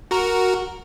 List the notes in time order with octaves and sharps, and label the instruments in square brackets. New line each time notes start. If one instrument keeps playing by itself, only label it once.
[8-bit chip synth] F#4 A#4